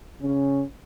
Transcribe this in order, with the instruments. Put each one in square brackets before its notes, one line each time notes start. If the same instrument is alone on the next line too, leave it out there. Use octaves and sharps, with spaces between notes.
[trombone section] C#3 C#4